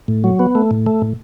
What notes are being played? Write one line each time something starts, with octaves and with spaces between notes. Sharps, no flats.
A2
F#3
B3
A3
A2
A3
A2